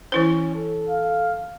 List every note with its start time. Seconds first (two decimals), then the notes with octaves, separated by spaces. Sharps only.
0.12 E3 C#4 E4 C5
0.55 A4
0.89 F5